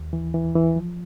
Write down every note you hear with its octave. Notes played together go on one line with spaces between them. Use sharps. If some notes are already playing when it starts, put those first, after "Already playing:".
Already playing: D#2
E3
E3
E3
F3